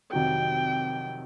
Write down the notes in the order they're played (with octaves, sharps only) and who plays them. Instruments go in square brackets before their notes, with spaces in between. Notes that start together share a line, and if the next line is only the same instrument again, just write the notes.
[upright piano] F2 C3 D#3 F#3 [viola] G5